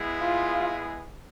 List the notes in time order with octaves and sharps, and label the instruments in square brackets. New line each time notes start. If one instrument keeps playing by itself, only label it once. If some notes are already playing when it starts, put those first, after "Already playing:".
Already playing: [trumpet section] G#3 B3 E4 G#4
[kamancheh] F4